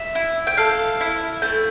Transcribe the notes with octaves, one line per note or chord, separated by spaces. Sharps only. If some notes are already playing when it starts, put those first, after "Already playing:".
Already playing: E5
E4
G5
A4 F5
E4
A3 G5